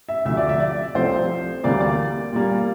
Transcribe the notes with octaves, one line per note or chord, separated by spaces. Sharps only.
E5
D2 C3 F3 E5
D5
E5
D5
C2 C3 F3 A3 C4 C5
D2 C3 E3 G3 A#3 D5
D5
A#2 G3 A#3